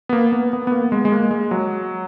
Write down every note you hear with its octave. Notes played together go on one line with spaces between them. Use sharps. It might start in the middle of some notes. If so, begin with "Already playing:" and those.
B3
A#3
B3
B3
B3
A#3
G#3
G#3
A#3
G#3
F#3